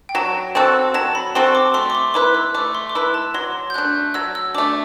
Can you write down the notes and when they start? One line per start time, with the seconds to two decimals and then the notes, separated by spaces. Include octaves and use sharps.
0.09 G5
0.15 F#3 A5
0.55 C4 F#4 A4
0.94 F#3 A5
1.15 B5
1.35 C4 F#4 A4 C6
1.55 D6
1.74 A3 C6
1.90 D6
1.95 C6
2.14 E4 B4 D6
2.35 E6
2.55 A3 D6
2.75 C6
2.90 D6
2.95 E4 B4 E6
3.14 A5
3.34 F#3 C6
3.70 G6
3.74 A3 D4 F#6
4.14 F#3 E6
4.35 E6
4.54 A3 D4 D6